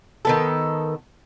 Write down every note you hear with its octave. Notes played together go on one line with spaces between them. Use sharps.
D#3 B3 A4